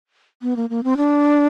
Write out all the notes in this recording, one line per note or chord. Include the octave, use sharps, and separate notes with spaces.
B3
A#3
A#3
C4
D4